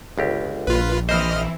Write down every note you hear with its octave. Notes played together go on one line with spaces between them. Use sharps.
G1 C#2 G4
A#1 F4 B4
E3 C4 E4 C5 D#5 F6